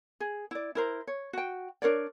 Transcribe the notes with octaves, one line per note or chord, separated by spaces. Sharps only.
G#4
E4 D5
E4 A#4 C5
C#5
F#4 G5
D4 A#4 C#5 D5